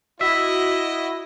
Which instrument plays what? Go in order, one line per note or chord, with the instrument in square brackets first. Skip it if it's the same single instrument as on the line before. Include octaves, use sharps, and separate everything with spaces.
[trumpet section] E4 [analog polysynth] F#4 [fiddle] D#5 [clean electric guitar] E5